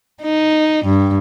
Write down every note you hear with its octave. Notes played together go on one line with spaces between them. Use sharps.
D#4
G2